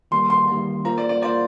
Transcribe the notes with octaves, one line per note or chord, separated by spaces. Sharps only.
D#3 G3 A#3 C6
C6
D#3 G3 A#3
A#3 F4 C5 A#5
D5
D5
A#3 F4 C5 D5